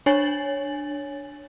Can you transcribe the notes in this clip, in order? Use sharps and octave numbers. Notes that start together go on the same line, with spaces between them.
D4 C#5 G#5 A6 F#7